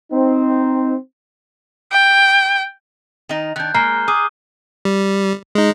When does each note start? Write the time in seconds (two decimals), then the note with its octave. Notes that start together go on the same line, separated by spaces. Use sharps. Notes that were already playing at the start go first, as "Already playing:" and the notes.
0.12 C4 D#4
1.92 G5
3.29 D#3 D#4
3.56 D#3 D4 F#6 G6
3.74 G#3 A#3 A#5 F6 C7 G7
4.08 G#4 D6 D#6 D#7
4.85 G3
5.55 G#3 D#4